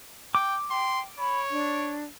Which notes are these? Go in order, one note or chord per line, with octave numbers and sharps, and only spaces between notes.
G5 D6
G5 C6
C#5 B5
D4